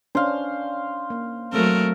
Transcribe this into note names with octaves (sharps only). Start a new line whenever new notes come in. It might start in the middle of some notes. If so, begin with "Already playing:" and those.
C#4 D4 C5 F5
A#3
F#3 A3 C4 A#4